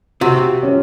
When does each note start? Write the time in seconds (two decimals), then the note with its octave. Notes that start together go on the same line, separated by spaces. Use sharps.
0.21 C3 C4 F#4
0.63 C#4